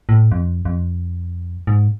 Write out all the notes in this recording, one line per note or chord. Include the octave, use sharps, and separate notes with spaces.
A2
F2
F2
G#2